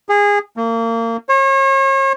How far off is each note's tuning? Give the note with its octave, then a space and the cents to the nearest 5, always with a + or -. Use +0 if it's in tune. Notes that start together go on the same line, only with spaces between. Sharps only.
G#4 -20
A#3 -30
C#5 -40